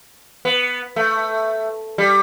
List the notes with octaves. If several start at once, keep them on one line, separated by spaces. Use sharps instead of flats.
B3
A3
G3